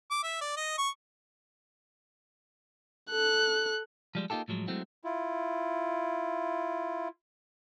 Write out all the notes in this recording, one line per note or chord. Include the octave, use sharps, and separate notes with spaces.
D6
E5
D5
D#5
C#6
A4 F#6
F3 G3 G#3
A#3 D#4 F4 G4 A4
A2 F3 F#3 G#3
F#3 G#3 A3 C4 E4 F#4
E4 F4